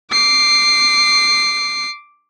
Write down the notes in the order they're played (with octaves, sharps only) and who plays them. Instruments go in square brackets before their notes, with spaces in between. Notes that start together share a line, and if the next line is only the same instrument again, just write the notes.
[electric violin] D6 C7